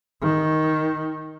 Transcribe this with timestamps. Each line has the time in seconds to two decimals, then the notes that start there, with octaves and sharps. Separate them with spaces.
0.21 D#3